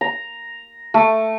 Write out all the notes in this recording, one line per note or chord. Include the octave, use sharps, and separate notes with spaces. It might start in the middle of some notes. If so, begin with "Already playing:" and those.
A#5
A3